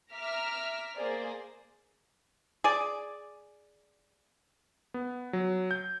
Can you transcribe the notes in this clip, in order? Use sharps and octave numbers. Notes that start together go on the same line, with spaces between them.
E5 A#5 D6 F6 B6
A#3 G#4 C5 D5
G#4 D5
B3
F#3
G6